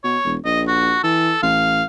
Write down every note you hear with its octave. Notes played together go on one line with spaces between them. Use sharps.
B2 C#5
E1
A#1 D#5
F#4
E3 A4
A1 F5